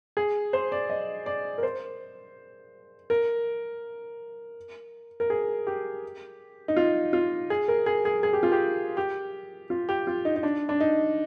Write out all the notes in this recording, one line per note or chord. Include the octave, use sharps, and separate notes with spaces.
G#4
C5
D5
D#5
D5
A#4
C5
A#4
A#4
G#4
G4
D#4
F4
F4
G#4
A#4
G#4
G#4
G#4
G4
F4
G4
G4
F4
G4
F4
D#4
D#4
D4
D4
D#4